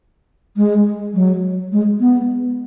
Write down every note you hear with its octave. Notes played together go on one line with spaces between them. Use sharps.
G#3
F#3
G#3
B3